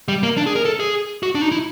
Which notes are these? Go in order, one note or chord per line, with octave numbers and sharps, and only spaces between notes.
G3
A#3
D4
G#4
A#4
A4
G#4
F#4
D4
D#4
E4